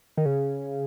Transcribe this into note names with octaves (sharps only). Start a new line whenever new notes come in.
D#3
C#3